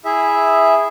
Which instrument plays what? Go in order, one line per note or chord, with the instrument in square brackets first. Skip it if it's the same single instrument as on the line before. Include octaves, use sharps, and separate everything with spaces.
[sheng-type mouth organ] E4 G#4 E5